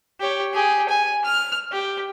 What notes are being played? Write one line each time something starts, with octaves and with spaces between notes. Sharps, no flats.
G4 C#5
G4 G#4
G#5
F6
G4